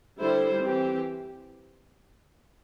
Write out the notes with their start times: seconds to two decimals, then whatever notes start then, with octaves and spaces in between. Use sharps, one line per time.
0.18 D3 G3 E4 A4 C5
0.62 E3 C4 G4